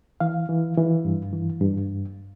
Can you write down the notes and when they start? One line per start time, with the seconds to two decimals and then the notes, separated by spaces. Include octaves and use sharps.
0.20 E3 F5
0.49 E3
0.77 E3
1.05 G2
1.33 E3
1.61 G2